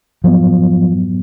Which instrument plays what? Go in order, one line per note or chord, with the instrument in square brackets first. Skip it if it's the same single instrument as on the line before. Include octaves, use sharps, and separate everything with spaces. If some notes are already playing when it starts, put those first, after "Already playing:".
[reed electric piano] G#2 F#3 B3 [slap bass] F3